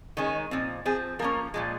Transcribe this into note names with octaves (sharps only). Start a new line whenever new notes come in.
D#3 G#3 C#4 D#4
A#2 F3 C4
F3 C4 G#4
F3 A#3 C#4 A#4
A#2 F3 G#3